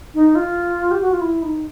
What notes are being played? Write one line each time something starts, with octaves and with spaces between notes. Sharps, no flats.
D#4
F4
G4
F#4
F4
E4
D#4